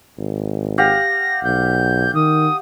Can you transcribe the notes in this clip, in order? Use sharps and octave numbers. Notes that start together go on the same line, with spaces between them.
G#1
G4 F5 F#5 A#6
B1 G6
D#3 D#6